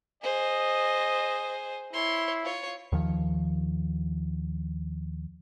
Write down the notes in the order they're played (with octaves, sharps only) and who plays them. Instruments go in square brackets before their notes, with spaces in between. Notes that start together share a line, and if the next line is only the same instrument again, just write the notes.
[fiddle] G#4 C5 [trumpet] D#5
[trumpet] E4 [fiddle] C#5 C6
[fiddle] F4 C#5
[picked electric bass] D#2 D#3 F3